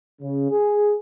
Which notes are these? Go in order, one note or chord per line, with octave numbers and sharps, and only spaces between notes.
C#3
G#4